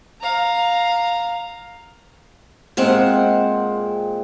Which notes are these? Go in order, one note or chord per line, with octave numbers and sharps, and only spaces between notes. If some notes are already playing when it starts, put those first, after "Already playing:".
F5 A#5
A#2 G#3 C4 F#5